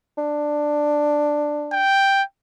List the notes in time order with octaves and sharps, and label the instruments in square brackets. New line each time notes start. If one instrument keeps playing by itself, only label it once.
[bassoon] D4
[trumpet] G5